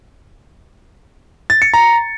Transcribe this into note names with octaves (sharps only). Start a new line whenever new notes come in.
A6
C#7
A#5